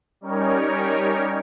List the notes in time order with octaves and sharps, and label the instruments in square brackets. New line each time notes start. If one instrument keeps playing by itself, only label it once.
[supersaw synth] G3 C#4 D#4 A#4 C#5